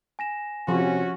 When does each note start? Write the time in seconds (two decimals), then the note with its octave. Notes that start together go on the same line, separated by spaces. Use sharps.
0.19 G#5 A#6 E7
0.68 C3 F3 C#4 F#4